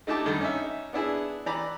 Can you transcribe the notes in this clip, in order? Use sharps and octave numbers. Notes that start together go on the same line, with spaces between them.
A3 D#4 E4 G4 A5 D6
G2 D3 D#3
C#4 D#4 E5
B3 D4 E4 G#4
E3 D5 A#5 B5